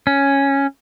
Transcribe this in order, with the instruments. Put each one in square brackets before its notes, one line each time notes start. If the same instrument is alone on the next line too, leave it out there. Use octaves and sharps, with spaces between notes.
[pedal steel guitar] C#4